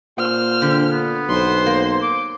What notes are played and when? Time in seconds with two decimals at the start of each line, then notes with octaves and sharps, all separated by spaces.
0.18 A#2 C5 F6
0.62 D3 G4
0.91 B3
1.29 B1 C5 C6
1.66 A#3
2.02 D6